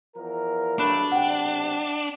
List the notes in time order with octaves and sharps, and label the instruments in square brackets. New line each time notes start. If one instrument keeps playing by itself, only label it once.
[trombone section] E2 F3 A#4
[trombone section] G2 F#3 A3 [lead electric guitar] D4 [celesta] B5 F#6 E7
[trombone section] B1 C3 [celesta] F#5 G5